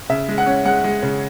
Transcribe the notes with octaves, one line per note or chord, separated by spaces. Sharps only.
C#3 E5
G#3
F#5
C#4
G#3 F#5
G#3
C#3